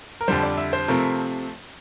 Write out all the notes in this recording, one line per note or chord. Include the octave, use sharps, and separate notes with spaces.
A#4
F2 D3 G3 C5
D5
E5
C5
C3 F3 A3 C4 A#4